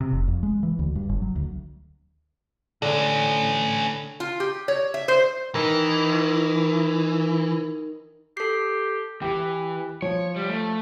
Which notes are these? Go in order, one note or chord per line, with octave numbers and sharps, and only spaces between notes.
C3
F1
F2
G#3
E3
D2
G2
G1
F#3
D2
A2 D3 C#4
F4
G4
C#5
E5
C5
E3 D#4 A#4
G4 A4 C7
E3 G4
F3 C#5
G3
A3